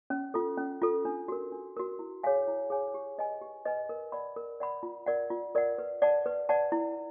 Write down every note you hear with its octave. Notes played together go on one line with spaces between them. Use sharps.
C#4
F4 A4
C#4
F4 A4
D4
F#4 A#4
D4
F#4 A#4
E4
G#4 C#5 F5 G#5
E4
G#4 C#5 F5 G#5
G4
B4 D#5 G#5
G4
B4 D#5 G#5
A#4
D5 F#5 B5
A#4
D5 F#5 B5
F4
A#4 D5 F#5
F4
A#4 D5 F#5
B4
D5 F#5 A5
B4
D5 F#5 A5
E4